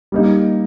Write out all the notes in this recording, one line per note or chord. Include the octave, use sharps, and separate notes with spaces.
G3 A#3 D#4